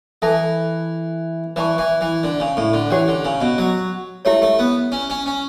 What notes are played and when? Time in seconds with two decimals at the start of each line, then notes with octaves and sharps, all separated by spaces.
0.22 E3 A4 E5 A5
1.56 E3 B4 D5 A5 C#6
1.78 E3
2.01 E3
2.23 D3
2.40 C#3
2.57 A2
2.73 D3
2.90 E3 C#4 G4 C#5 F#5
3.08 D3
3.25 C#3
3.41 B2
3.58 F#3
4.25 A3 E4 G4 C#5
4.42 A3
4.59 B3
4.92 C#4
5.10 C#4
5.26 C#4